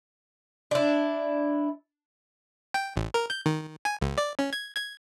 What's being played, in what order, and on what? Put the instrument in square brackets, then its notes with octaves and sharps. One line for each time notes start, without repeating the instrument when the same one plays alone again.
[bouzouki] D4 E4
[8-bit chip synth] G5
A1
A#4
G6
D#3
G#5
C#2
D5
C#4
G#6
G#6